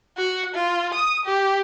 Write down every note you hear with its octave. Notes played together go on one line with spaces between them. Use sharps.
F#4
F4
D#6
G4